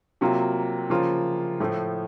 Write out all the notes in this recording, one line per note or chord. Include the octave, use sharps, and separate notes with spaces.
C3 F#3 A#3 F4
C#3 F3 A#3 F4
A2 F3 A3